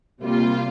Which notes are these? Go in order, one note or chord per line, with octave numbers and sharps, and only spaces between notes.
C3 G3 A#3 F4